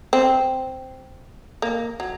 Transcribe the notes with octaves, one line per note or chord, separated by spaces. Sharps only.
C4
A#3
F#3